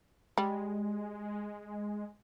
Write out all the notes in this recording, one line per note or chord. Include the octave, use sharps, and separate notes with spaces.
G3 G#3